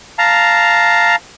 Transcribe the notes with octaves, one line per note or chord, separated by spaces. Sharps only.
F5 A5 A#5